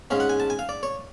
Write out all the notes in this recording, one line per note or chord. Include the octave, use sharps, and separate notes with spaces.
G#2 G#3 C#4 F5
F#5
G#5
A5
G#5
F5
D5
C#5